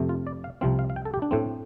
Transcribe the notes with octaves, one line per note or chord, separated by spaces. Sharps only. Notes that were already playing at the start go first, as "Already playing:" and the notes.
Already playing: F2 C3 A3
F4
D5
F5
C2 C3 F3 C4 F5
F5
F5
G5
A4
G4
D4
A2 A3 C4